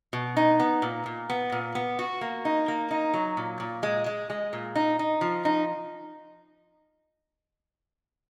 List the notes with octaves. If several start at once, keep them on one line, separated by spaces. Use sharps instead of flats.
B2
D#4
B3
A#2
A#2
B3
A#2
B3
F#4
A#3
D#4
A#3
D#4
F#3
A#2
A#2
G#3
G#3
G#3
A#2
D#4
D#4
F3
D#4